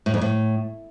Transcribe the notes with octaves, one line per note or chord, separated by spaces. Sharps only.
A2
F2
A2